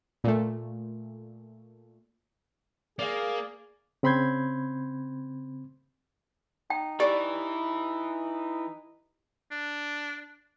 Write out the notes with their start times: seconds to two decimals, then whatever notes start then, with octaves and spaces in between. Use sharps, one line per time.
0.24 A#2 A3
2.99 A#3 G#4 D5 F5
4.03 C#3 C4 B5 C6 G6 G#6
6.70 D#4 G5
7.00 E3 G4 D5
9.51 D4